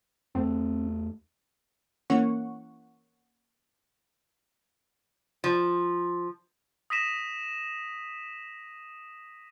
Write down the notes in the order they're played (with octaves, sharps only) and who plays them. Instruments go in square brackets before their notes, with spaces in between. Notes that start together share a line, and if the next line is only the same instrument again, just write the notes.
[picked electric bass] E2 A3 [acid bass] C4
[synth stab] E3 A#3 C#4 F#5 C#6
[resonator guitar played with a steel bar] F3
[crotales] D#6 A#6 B6 D#7 E7